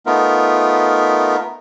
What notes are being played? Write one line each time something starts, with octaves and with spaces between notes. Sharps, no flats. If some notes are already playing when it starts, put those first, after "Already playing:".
A3 B3 D#4 F4 A#4